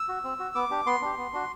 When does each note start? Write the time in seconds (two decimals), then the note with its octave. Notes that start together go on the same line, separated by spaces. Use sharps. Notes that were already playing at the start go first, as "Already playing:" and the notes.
Already playing: E6
0.09 F#4
0.24 C4
0.40 F#4
0.55 B3 D6
0.71 D4 G4
0.86 B3 C6
1.02 D4 G4
1.17 B3
1.33 D4 F#4